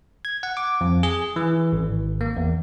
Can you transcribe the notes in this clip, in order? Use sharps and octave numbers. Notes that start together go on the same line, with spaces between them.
G#6
F#5
D6
F2
G#4
E3
G#1
A#3
E2